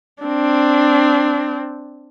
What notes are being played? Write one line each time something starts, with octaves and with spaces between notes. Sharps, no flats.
C4 D4